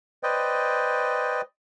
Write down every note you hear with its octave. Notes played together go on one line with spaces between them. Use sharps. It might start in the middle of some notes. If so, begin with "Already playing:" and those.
B4 C5 D5 D#5 G5